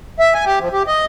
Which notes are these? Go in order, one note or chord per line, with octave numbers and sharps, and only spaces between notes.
E5
G#5
G4
F3
G4
D#5